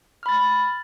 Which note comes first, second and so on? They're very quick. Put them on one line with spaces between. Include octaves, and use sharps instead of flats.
F6 B5 A6